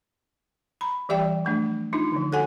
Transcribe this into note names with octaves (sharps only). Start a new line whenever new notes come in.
A#5 B5
E3 G3 G4 D5 E5 G5
F3 A3 D4
D4 D#4 F4
D3 F3
F#4 A4 C#5 F#5 G#5